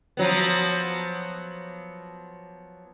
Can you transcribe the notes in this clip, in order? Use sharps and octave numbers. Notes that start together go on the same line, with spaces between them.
F3 F#3 B3